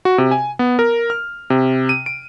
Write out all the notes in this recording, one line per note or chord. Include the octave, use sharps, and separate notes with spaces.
F#4
C3
G#5
B3
A#4
F6
C3
D#7
D7